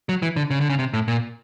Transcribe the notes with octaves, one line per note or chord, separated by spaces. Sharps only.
F#3
E3
D3
C#3
D3
C#3
C3
A2
A#2